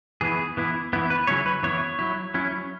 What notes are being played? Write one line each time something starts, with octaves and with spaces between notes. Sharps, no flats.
E3 B3 E4 G#4
E3 B3 E4
E3 B3 E4
B4
C#3 F#3 C#4 E4 C#5
B4
E3 B3 E4 C#5
F#3 E4
F#3 C#4 E4